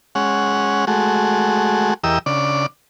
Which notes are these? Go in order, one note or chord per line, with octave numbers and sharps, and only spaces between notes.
G#3 C#4 F#5
G#3 A3 F#4
E2 G4 A#4 D#5 E6
C#3 D4 D5